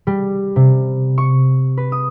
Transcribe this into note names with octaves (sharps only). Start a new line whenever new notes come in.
G3
C3
C#6
B4
D#6